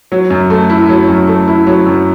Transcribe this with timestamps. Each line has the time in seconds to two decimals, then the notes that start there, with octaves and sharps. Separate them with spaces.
0.12 F#3
0.30 F#2
0.50 A3
0.70 E4
0.89 F#3
1.09 F#2
1.28 A3
1.48 E4
1.67 F#3
1.86 F#2